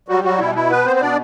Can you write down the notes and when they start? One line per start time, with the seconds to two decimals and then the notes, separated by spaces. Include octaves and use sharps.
0.08 F#3 G3 F#4
0.24 F#3 F#4
0.39 B2 E4
0.55 E4
0.70 B3 B4
0.85 C4 C5
0.96 C5
1.01 B2 D4 D5